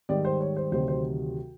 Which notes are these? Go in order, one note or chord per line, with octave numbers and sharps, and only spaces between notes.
G#2 D#3 G3 D5
C5
C#5
C5
D2 C3 D#3 F#3 C5
C5